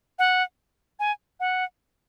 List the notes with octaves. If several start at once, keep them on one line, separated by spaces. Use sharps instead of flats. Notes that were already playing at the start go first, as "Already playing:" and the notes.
F#5
G#5
F#5